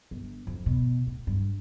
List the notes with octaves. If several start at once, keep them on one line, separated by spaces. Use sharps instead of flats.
G1
F2
B2
A2
G2